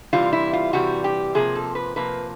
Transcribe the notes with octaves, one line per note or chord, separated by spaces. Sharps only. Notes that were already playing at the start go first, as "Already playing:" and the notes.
C3 E3 G3 F4
E4
F4
C3 E3 G3 F#4
G4
C3 F3 A#3 G#4
A4
B4
C3 F3 A#3 B4